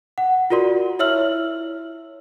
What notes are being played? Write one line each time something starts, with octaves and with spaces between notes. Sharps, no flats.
F#5
F4 F#4 A#4 D5 C6
E4 C#5 E5 E6 F6 F#7